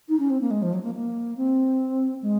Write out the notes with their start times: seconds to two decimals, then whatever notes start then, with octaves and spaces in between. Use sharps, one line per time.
0.09 D#4
0.19 C#4
0.30 C4
0.41 A#3
0.51 G#3
0.62 F3
0.73 F#3
0.84 A#3
0.95 A#3
1.37 C4
2.22 G#3